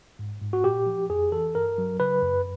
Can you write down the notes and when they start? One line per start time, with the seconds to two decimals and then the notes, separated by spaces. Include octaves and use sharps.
0.19 G#2
0.42 G#2
0.53 F#4
0.64 A#2 G4
0.87 F3
1.09 F2 G#4
1.32 E3 A4
1.55 G2 A#4
1.78 F#3
2.00 C#3 B4
2.22 F#2